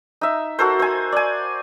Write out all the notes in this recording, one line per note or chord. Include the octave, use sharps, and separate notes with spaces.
D#4 E5
F#4 A4 A#4 C5
C5 G#5
D5 G#5